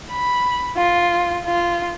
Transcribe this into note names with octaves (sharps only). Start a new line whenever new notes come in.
B5
F4
F4